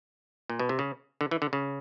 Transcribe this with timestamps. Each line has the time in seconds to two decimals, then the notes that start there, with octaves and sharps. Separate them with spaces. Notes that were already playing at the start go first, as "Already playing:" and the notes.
0.50 A#2
0.59 B2
0.69 C3
0.79 C#3
1.21 D3
1.31 E3
1.42 D3
1.53 C#3